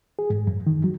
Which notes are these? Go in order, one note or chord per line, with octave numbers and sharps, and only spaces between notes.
G#4
G#2
F#2
D#3
F#3